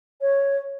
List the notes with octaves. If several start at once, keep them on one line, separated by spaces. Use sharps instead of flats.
C#5